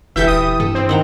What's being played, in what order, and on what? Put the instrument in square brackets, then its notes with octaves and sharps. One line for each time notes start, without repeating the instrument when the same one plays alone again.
[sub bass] E1 [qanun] E3 G4 A4 [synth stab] E5 G6
[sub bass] D#1 [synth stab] D#6
[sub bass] G2 [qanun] A4
[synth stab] C4
[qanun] D#3 F#5 A#5